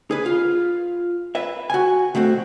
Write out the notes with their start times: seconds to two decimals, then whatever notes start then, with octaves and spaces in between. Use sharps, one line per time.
0.11 G#4 B4
0.26 F4
1.35 B4 E5
1.70 F#4 G#5
2.15 B2 A3 C4 F#4